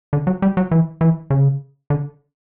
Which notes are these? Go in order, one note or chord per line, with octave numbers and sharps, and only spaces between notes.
D3
F#3
G3
F#3
E3
E3
C#3
D3